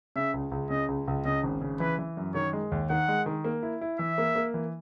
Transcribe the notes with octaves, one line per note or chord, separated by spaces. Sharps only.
C#3 E5
C#2
C#2
C#3 D#5
C#2
C#2
C#3 D#5
G#1
C#3
E3 B4
E3
F#2
D#3 C#5
G#3
D#2
D#3 F#5
G#3
D#3
A#3
E4
E4
E3 E5
A#3
A#3
E3